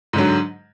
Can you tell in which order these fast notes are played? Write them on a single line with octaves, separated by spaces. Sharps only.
G#2 D3 F#3